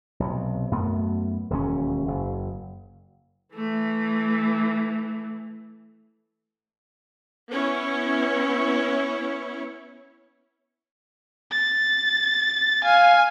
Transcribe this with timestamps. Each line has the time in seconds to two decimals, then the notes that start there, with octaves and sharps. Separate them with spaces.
0.20 B1 C3
0.72 F#2 A3 B3
1.50 E1 D#2 C#3 C#4
2.08 F#1
3.55 E3 A3
7.52 B3 C#4 E4 C#5
11.51 A6
12.85 F5 G#5